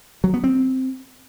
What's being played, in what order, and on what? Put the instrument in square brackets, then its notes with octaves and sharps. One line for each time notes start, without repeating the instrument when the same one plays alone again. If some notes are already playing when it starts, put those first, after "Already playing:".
[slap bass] F#3
B3
C4